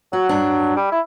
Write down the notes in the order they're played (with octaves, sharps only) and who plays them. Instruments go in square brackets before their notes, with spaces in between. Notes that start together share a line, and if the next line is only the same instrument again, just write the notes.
[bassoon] F#3 [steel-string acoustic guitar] F#4
[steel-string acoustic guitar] G2 D4
[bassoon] G3
E4